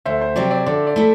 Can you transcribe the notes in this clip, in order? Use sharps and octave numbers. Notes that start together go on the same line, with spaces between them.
D2 C5 E5
C5
C3 F#3 C4 G4 D5
D5
D3 D5
D5
A3 E4